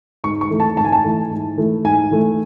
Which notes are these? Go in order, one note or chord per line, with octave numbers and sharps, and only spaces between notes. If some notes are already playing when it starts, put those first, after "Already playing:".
G#2 C#6
C#6
E3 A3
A5
G#2 A5
G#5
A5
E3 A3
G#2
E3 A3
G#2 G#5
E3 A3